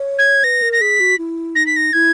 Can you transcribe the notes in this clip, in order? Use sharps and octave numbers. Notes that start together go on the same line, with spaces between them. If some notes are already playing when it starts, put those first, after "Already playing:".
Already playing: C#5
G#6
B4 A#6
A#4
A#6
G#4 B6
F#4
E4
D#4 A#6
B6
A#6
E4 G#6